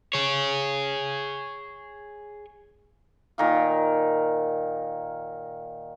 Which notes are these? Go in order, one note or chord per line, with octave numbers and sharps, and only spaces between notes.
G#4 C#5
A#2 D#3 F5